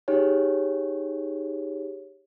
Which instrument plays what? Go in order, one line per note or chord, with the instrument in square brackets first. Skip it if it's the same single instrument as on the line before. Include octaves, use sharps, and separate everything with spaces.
[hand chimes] D#4 G4 G#4 C#5